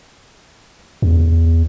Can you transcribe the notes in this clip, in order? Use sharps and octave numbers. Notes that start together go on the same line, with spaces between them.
E2